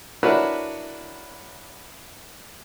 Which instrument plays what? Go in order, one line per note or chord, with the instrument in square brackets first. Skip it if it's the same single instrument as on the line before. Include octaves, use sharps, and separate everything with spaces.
[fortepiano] D4 E4 F#4 A#4 B4 C#5